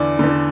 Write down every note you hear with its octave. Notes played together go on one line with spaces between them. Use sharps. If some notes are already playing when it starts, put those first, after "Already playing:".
Already playing: E2 D3 D5
E2 D3